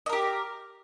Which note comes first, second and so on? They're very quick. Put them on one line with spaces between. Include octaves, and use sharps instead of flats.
D#5 A#4 G4